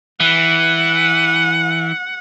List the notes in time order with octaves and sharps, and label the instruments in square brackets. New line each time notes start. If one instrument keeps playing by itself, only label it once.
[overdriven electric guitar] E3 [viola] F#5